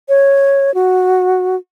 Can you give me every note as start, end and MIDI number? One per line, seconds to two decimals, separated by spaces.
0.09 0.74 73
0.74 1.56 66